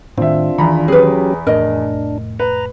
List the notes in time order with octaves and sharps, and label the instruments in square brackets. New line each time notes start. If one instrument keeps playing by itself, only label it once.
[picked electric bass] A2 D#3 [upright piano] C4 E5 [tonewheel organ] D4 F4
[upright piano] E2 A#5 B5 [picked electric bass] D#3
[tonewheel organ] F#3 C#4 G4 [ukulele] G#4 B4
[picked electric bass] F1 A2 [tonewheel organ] D4 [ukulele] A#4 D#5
[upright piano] B4 [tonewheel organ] A#5